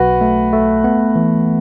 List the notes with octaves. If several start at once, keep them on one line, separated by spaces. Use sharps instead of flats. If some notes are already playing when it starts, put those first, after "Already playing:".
Already playing: B1 F#4 B4
A3
A3
B3
E3